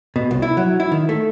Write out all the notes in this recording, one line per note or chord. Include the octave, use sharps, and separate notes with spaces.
B2
C2
E4
F#3
E4
D#3
A3